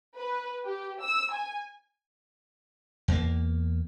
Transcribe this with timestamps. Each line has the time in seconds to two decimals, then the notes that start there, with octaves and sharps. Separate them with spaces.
0.17 B4
0.66 G4
1.02 E6
1.32 G#5
3.08 E2 A#3